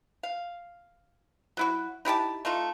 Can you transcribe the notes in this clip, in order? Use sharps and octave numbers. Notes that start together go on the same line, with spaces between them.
F5
F#3 E4 F#4
D#4 E4 G4 A5
A3 D#4 F4